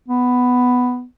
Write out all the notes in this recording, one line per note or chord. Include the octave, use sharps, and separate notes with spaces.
B3